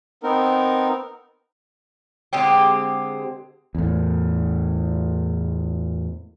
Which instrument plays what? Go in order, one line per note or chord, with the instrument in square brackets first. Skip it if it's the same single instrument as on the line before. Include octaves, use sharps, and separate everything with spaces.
[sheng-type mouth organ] B3 C4 D#4 A#4
[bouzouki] D3 G#3 C4 G4
[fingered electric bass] E2 A2